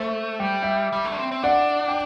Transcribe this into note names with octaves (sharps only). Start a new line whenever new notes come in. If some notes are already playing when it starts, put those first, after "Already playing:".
Already playing: A3 C5 E5
G3 G5
E5 G5
G3
A3
D4
C4
C4
D4 D5 F#5
G5